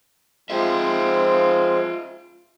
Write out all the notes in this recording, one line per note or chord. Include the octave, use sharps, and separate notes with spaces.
F3 G#3 C4 F4 E5